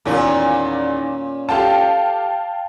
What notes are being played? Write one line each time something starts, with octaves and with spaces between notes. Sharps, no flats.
E2 A#2 D#3 C#4
F4 G4 A4 F5 G5 A5